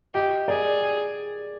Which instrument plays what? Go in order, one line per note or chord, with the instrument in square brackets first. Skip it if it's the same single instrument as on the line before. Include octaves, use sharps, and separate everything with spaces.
[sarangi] G4 [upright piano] D#5
[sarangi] G#4 [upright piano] D5